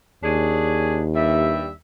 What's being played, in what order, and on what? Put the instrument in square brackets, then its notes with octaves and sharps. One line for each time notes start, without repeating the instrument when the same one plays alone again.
[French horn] D#2 [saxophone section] C#4 D4 G#4
[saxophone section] G2 G3 E5